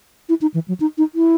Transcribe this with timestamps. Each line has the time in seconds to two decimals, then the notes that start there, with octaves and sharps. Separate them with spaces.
0.29 E4
0.41 D#4
0.54 E3
0.68 F#3
0.80 D#4
0.98 D#4
1.15 E4